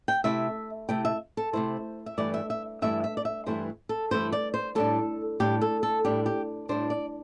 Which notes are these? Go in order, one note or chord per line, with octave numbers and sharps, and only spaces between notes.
G5
C3 A3 E4 E5
C3 A3 E4 G5
E5
A4
C3 A3 E4 C5
E5
G2 E3 A3 E4 D5
E5
E5
G2 E3 A3 E4 E5
E5
D5
E5
G2 E3 A3 E4 C5
A4
G2 E3 A3 E4 C5
D5
C5
A2 G3 D4 A4
A2 G3 D4 G4
A4
A4
A2 G3 D4 G4
G4
A2 G3 D4 C5
D5